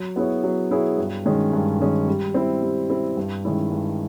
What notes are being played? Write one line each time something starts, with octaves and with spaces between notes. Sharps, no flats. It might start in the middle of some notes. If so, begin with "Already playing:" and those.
Already playing: F#3
B3 E4 G#4 C#5
F#3
B3 E4 G#4 C#5
G2
D#3 G#3 C#4
G2
D#3 G#3 C#4
G3
C4 E4
G3
C4 E4
G2
D#3 G#3 C#4 E4
G2